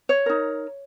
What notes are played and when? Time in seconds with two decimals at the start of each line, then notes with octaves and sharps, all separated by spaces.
0.09 C#5
0.26 D#4 A#4